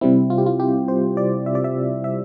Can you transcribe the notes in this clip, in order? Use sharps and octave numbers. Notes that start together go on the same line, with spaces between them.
C3 G3 C4 E4
F4
G4
F4
G4
C5
D5
E5
D5
E5
E5